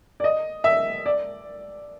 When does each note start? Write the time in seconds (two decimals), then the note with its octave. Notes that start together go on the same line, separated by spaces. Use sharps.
0.20 D5
0.24 D#5
0.64 E5
1.06 D5